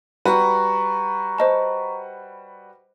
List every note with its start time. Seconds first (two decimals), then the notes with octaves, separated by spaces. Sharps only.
0.25 G3 F#4 B4 A#5 C#6
1.38 C5 D#5 A5